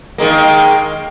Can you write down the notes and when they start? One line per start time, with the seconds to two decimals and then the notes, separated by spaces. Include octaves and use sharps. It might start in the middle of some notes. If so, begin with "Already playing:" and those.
0.18 D#3 G#3 A#3